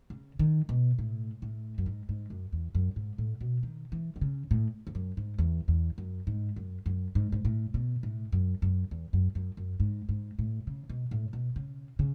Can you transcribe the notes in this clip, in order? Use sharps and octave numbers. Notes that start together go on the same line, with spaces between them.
C#3
D#3
B2
A2
A2
F#2
G#2
G#2
F#2
E2
F#2
G#2
A2
B2
D#3
E3
D#3
C#3
A2
E2
F#2
G#2
E2
E2
F#2
G#2
F#2
F#2
G#2
G#2
A2
B2
A2
F#2
F#2
E2
F#2
F#2
F#2
G#2
G#2
A2
C#3
B2
A2
B2
C#3
C#3